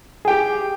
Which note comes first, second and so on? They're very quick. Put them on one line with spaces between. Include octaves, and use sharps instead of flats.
G#4 G5 G4